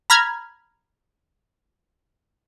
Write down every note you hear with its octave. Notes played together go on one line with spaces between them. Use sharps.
A#5 B5 F6 G#6